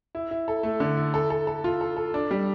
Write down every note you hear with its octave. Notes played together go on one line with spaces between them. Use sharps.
E4
E4
A4
A3
D3
E4
A4
A4
A4
F4
A4
A4
D4
G3